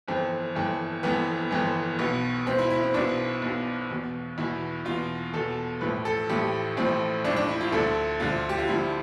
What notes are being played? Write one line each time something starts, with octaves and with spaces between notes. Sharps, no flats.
G1 F2 E3 C4
G1 F2 E3
G1 F2 E3 B3
G1 F2 E3
B1 B2 B3
B1 B2 C4
E4
E4
C4
B1 B2 D4
B1 B2
E2 B2
E2 B2 E4
E2 B2 F4
E2 B2 A4
A1 A2 F3 B4
A4
A1 A2 F3 G4
A1 A2 F3 C4
A1 A2 F3 D4
D4
E4
F4
D2 D3 F3 A4
D2 D3 F3 F4
G4
F4
D2 D3 F3 E4